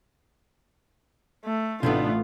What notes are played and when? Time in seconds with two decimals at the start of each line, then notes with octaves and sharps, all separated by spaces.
1.45 A3
1.83 A1 C3 A3 B3 D4 D#4 F4